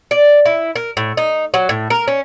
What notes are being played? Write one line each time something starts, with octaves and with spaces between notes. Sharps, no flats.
D5
E4
A#4
A2
D#4
F#3
A2
A#4
C#4